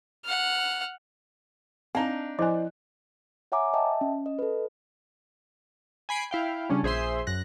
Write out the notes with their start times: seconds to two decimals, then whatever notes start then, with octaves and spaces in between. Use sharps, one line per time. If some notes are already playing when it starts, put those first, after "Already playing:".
0.25 F#5 F6
1.95 C4 D4 D#4 F5 A5 A#5
2.39 F3 E4 C5 D5 D#5 G#5 F#6
3.52 C#5 E5 F#5 G#5 A#5 D6
3.74 D#5 E5 G5 A5
4.01 C#4
4.26 D#5
4.39 A4 B4
6.09 G#5 B5 C7 D7
6.31 E4 F5 G5
6.69 C#3 G3 C#4 D4
6.83 A#1 G#4 C5 E5 C6
7.27 F#2 F#6 A#6